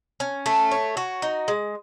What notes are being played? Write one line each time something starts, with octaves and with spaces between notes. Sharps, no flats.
C#4
A3
C#5
F#4
D#4
G#3